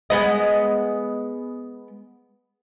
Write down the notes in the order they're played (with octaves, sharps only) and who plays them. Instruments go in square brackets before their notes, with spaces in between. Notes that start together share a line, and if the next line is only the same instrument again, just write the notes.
[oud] G#3 B3 D#5